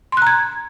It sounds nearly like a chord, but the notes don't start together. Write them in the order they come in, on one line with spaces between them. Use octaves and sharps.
C6 F#6 A#5 G#6